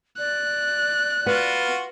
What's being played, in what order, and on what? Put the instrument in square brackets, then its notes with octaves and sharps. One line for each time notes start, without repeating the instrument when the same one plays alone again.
[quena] D5 [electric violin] F#6
[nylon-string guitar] B3 [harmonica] F4 F#4